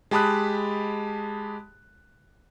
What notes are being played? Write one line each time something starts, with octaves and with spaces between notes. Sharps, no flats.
G#3 G4 A5 B5 D#6 F#6